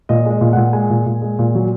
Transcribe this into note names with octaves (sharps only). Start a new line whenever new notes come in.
A#2 D#5
G#3
D#5
A#2
A#2 F#5
G#3 G#5
A#2
A#2
G#3
A#2
F#3